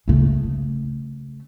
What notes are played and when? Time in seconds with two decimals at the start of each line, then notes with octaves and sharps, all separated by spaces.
0.08 C#3 A3